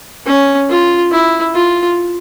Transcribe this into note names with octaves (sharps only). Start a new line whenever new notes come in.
C#4
F4
E4
F4